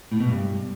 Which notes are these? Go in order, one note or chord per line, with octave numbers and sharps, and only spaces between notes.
A2
B2
G2